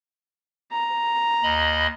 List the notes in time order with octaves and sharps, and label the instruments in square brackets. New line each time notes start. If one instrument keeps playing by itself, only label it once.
[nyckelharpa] A#5
[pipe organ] D#2 D#5 B5